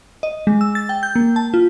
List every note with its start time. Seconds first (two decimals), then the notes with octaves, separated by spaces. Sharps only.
0.23 D#5
0.47 G#3
0.61 E6
0.75 A6
0.89 G5
1.03 G6
1.15 A#3
1.36 A5
1.54 F4